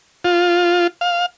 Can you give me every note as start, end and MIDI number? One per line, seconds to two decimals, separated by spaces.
0.25 0.87 65
1.01 1.26 77